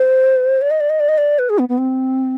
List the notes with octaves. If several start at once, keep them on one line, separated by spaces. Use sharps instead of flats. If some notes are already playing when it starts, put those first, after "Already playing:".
Already playing: C5
D5
D#5
D5
D#5
D5
D#5
D5
B4
G#4
B3
B3
C4